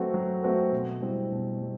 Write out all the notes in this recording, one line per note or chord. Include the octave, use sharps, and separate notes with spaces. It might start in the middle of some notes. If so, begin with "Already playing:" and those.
Already playing: F#3 A3 C4 F#4 B4
F#3
A3 C4 F#4 B4
B2
G3 C4 E4
B2
G3